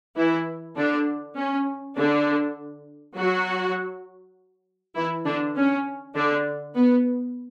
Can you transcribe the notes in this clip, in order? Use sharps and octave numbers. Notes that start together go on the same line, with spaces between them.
E3 E4
D3 D4
C#4
D3 D4
F#3 F#4
E3 E4
D3 D4
C#4
D3 D4
B3